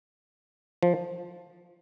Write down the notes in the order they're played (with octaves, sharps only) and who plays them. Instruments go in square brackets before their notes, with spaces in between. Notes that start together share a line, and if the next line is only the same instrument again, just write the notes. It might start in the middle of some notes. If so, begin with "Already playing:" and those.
[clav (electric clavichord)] F3